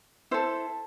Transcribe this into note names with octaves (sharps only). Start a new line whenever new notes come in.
E4 A4 C5